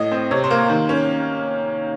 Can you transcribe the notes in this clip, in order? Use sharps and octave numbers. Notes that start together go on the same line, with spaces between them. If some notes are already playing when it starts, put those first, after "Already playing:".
Already playing: A2 D#5
C4
C3 C#5
C5
A#3
D#3
C#4